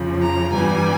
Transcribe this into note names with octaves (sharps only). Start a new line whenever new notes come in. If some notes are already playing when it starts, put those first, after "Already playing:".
Already playing: F2 C#3 F3
A#5
G2 E3 G3 B3 G#5